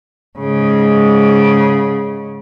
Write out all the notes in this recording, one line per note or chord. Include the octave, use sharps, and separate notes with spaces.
G#2 C#3